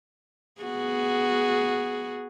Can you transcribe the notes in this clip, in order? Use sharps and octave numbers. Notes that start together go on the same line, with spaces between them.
B3 F#4 G#4